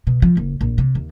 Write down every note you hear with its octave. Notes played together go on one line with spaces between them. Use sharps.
B2
F3
F#1
A#1
C3
D#2